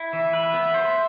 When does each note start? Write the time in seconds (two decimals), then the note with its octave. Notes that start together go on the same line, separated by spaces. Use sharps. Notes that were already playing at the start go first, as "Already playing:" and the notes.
Already playing: E4
0.12 E3 E5
0.33 B4
0.54 B3
0.74 C5